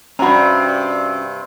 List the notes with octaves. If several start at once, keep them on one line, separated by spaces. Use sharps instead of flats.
G2 C3 C#4 F#4 A#5 B5